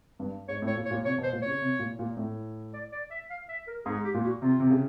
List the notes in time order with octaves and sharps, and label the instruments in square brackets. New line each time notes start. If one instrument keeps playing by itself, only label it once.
[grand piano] G2
[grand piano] G#2 [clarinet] C#5
[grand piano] A2
[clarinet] C#5
[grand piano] A#2
[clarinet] C#5
[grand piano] A#2
[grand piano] C3 [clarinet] C#5
[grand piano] B2
[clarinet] C5
[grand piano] A#2
[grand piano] C#3 [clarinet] C#5
[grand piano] C3
A#2
A#2
A2
[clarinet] D5
D5
E5
F5
E5
A#4
[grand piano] G#2 [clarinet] G#4
[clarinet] G4
[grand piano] A#2
[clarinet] F#4
[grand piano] C3 [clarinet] F4
[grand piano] C3
C#3